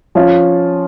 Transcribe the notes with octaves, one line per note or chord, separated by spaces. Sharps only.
F3 C#4 F4